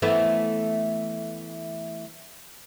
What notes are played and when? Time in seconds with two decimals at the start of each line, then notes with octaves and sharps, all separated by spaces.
0.02 E3 A3 B3